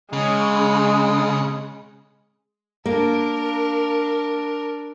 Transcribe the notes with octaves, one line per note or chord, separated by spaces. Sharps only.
C#3 G#3
A#3 D4 A#4